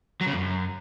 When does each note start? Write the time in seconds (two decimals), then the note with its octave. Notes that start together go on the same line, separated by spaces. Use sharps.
0.21 F#3
0.26 C#3
0.32 F2
0.38 F#2